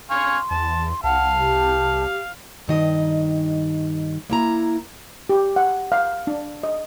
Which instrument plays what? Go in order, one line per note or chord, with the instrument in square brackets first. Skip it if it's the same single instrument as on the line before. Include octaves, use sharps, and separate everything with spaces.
[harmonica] F5 G#5 C#6 [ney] C6
[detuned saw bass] E2 [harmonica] A5
[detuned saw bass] C2 [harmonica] F5 [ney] F#5 [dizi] A5
[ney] G4
[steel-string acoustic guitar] G2 D#3 D#5
A#3 E4 A#5
[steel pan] G4
F#5
F5
D4
D#5